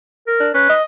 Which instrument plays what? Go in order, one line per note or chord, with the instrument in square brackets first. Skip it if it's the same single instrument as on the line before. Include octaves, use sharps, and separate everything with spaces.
[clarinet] A#4
[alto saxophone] D4
[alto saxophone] C#4 [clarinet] B4
[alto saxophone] D#5